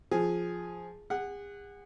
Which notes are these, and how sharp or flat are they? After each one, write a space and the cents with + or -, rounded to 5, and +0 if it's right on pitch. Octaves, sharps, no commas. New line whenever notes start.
F3 +0 G#4 +0
G#4 -40 F#5 +0